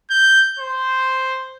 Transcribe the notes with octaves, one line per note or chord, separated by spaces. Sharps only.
G6
C5